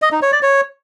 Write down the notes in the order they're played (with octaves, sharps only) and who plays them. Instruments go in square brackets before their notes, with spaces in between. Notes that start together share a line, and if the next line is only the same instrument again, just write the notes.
[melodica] D#5
D#4
C#5
D5
C#5